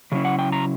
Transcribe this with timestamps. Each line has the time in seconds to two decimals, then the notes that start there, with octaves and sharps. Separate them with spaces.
0.12 C#3 F#3 C#4 E4
0.25 F#5
0.39 G5
0.52 A#5